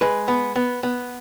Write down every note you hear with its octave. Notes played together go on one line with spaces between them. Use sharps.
G#3 B4
B3
B3
B3